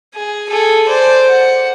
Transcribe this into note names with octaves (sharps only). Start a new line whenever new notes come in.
G#4
G#4 A4
C5 D5
F#5